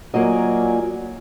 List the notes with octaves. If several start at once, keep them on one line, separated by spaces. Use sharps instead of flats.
F#3 A#3 F4 D5 D#5 G#5